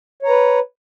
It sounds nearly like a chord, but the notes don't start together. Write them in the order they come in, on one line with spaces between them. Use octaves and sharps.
C#5 A#5 B4